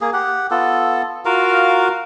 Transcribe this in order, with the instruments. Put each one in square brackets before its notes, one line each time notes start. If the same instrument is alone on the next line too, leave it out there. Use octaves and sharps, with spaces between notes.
[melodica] A#3 G#4
G4 F#5
B3 F4 A4
F4 F#4 A#4 F5